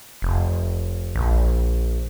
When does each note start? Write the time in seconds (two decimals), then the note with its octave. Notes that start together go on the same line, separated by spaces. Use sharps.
0.22 F1
1.15 A#1